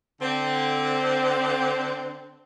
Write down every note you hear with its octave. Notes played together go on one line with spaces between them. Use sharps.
D3 C4